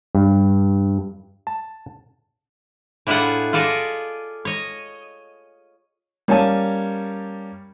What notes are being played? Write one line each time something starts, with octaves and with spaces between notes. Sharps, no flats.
G2
A5
A2 D4 E4 F4 G#4 F#5
F4 G#4 A4 D5 D#5
C#5 D#5
G3 A#3 C#4 C#5 G#5 A5